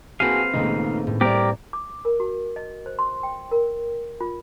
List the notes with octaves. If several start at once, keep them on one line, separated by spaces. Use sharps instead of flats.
A#3 C4 F#4 G#4 B4 F5 D#7
C#2 A#2 D#3 A3 D#4
A2
G3 G4 A#4 C5 D5
D6
A#4
F#4
D#5
C5
C6
G5
A#4
F4